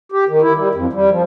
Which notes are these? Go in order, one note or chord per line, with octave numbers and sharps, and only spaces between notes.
G4
D#3
E4
G3
F2
G3
F3